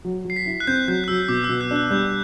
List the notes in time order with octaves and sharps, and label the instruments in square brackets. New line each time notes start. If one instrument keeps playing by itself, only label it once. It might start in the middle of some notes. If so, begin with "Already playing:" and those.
[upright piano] F#3
[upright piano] F#3 [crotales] C7
[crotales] B6
[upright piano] E4
[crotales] F#6
[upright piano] C4 [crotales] G6
[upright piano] F#3 [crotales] G6
[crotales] F#6
[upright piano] F#3 [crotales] E6
[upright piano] B2 [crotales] D6
[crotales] E6
[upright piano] B2
[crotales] F#6
[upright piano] D4
[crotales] F#6
[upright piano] G3 [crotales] G6